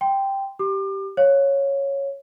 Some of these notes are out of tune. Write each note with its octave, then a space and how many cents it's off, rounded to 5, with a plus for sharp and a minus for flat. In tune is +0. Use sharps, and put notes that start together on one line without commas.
G5 +0 C6 -15
G4 -10 D6 +35
C#5 -5 F5 +10